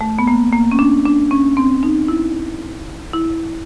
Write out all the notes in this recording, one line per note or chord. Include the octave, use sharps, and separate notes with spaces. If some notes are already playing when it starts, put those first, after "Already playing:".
A3
B3
A#3
A#3
C#4
D4
D4
C#4
C4
D#4
E4
E4